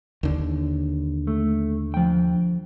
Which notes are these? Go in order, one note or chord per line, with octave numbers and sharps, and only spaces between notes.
D#2 D3
A3
F3 G5